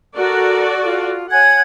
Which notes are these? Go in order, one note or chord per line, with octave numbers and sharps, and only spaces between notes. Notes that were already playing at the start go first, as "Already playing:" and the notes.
F#4 A4 A#4 D5
F4
C#5 F#5 G#5 G#6